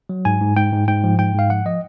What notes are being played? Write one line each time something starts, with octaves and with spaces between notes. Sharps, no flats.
F#3
G#2 G#5
G#2
G#2 G5
G#2
G#2 G5
F3
G#2 G5
G#2 F5
F3 F#5
F3 D#5